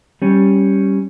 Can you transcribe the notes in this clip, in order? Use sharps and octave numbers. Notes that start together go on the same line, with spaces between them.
G3 C#4